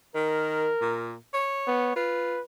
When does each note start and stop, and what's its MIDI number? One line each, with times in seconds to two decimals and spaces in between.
0.15 0.68 51
0.15 1.15 70
0.81 1.15 46
1.34 1.92 73
1.67 1.91 59
1.96 2.38 65
1.96 2.42 71